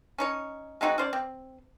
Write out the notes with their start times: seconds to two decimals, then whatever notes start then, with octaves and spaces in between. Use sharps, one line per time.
0.18 C#4 D#4 C#5
0.81 G#3 C4 D#4 F#4
0.98 C#4 C5 D5
1.13 C4